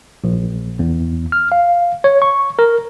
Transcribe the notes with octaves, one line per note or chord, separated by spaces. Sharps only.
A#1
E2
F6
F5
C#5
C#6
A#4